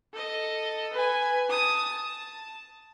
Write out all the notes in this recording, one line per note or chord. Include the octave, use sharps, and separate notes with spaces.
A4 D#5
B4 G#5
A5 D#6
A5